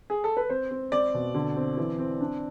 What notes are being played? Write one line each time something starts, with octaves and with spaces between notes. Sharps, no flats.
G#4
A4
B4
C4 C5
C4
C4 D5
B2
D3
C4
E3
C4
D4